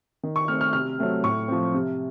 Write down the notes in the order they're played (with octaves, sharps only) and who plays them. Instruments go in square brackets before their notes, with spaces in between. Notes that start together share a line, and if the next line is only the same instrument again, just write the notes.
[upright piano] D#3
C#6
A3 C4 F6
F6
C3 F6
F#3 A3 C4
A2 C#6
F3 C4
C3